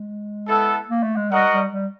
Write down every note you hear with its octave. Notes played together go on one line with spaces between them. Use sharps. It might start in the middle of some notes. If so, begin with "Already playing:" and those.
Already playing: G#3
B3 E4 A4
A#3
A3
G#3
G3 F#4 A#4 D#5 F#5
G3
G3